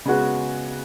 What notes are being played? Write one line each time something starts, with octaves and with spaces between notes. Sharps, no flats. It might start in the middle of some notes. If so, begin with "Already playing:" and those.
C#3 G#3 B3 F#4